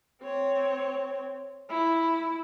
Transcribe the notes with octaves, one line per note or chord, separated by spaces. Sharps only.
C4 C#5
E4